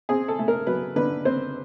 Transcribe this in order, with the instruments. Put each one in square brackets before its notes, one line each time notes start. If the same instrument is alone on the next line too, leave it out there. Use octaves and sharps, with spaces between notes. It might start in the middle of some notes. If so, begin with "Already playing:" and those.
[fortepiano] C4 G#4
A4
A3
A#4
F#3 B4
D3 B4
C4 C5